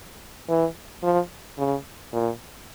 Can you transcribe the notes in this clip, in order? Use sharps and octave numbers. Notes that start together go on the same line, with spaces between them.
E3
F3
C#3
A#2